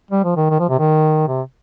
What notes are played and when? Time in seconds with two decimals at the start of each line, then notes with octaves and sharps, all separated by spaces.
0.11 G3
0.24 F3
0.37 D#3
0.50 D#3
0.59 F3
0.69 C3
0.79 D#3
1.28 C3